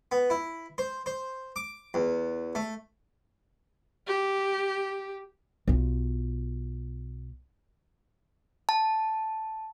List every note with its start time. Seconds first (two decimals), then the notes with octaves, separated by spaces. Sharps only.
0.12 B3
0.30 E4
0.78 C5
1.06 C5
1.56 D6
1.94 E2
2.55 A3
4.07 G4
5.68 B1 F4
8.69 A5